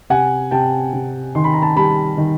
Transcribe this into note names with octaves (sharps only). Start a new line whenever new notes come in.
C3 F#5 G#5
C3 G5 A5
C3
D#3 C6
B5
A#5
A5 B5
G3 A5 B5
D#3